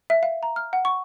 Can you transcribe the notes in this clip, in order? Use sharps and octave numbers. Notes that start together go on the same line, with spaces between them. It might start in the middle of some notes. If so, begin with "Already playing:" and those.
E5
F5
A#5
F6
F#5
C#6